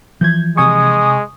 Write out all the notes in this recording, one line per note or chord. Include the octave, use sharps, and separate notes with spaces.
E3 F3 G6 G#6
C3 G#3 G#5 C#6 D#6